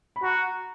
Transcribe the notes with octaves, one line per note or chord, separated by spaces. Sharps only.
B5
F#4 A#5